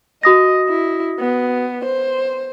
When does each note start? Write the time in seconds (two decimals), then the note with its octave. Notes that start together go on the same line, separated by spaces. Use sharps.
0.23 F#4 D#5 D#6 A#6
0.69 E4
1.20 B3
1.85 C5